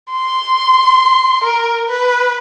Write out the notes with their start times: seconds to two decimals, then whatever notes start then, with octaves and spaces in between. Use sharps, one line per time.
0.12 C6
1.44 A#4
1.88 B4